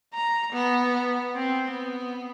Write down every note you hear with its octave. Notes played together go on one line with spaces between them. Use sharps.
A#5
B3
C4
B3